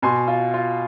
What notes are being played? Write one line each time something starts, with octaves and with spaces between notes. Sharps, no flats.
B2 G#5 C6
F4
F4